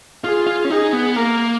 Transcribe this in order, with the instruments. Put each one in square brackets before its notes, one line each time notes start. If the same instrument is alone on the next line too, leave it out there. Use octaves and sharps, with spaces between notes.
[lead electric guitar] F4 [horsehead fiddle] G#4
[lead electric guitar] F4
C#4
[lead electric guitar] D#4 [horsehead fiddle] G#4
[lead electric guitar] B3
[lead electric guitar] A#3 [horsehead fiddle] A#4